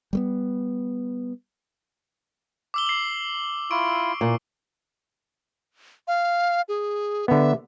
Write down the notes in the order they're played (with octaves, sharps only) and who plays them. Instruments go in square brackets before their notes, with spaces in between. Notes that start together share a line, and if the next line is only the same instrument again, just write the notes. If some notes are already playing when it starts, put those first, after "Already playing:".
[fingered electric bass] G3 A3 B3
[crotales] D6 E6 G7
C7 F#7
[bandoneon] E4 F4 [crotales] C#6 D7
[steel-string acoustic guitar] A#2
[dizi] F5
G#4
[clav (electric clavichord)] D3 B3 [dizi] E5